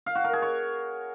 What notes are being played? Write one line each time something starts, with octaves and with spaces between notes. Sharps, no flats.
F5
F#4
A#4
G#4
C#5